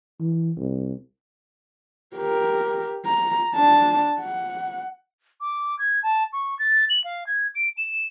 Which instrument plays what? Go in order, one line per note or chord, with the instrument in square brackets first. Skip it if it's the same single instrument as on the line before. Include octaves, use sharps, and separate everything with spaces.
[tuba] E3
C2
[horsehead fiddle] G4 A#4
A#5
D4 A5
F#5
[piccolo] D6
G#6
A5
C#6
A6
F#7
F5
G#6
D7
E7